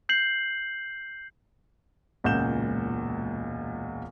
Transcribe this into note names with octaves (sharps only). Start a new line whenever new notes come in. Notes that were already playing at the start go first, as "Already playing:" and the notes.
G6 C7 F#7
E1 C#2 A#2 F#5 G6 E7